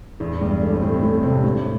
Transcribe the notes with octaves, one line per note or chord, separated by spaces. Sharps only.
E2 E3
G2 G3
A2 A3
C4
A2 A3
C4
A2 A3
C3 C4
A2